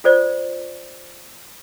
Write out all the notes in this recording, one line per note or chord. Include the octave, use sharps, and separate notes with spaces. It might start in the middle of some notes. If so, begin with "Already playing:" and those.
F4 A4 C5 D5